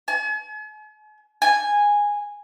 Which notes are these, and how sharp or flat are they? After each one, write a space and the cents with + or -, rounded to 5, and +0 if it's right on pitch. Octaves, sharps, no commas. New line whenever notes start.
G#5 +45
G#5 -10